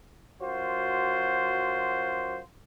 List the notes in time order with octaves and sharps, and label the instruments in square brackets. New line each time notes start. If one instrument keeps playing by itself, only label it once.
[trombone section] F#2 F4 F#4 C5